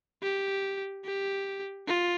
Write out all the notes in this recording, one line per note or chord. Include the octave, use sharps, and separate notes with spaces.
G4
G4
F4